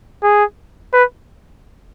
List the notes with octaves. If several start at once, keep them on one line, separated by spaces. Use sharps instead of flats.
G#4
B4